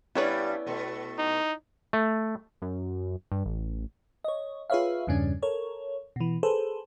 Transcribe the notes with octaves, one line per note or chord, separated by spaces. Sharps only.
G2 G3 B3 C#4 E4 B4 C#5 D5
B2 A3
D#4
A3
F#2
G2
A1
C#5 D#5
F4 G#4 B4 C#5 E5 F5
E2 G2 C#3 G3 C#4 D4
A4 A#4 C#5
B2 E3
G#4 A4 B4 C5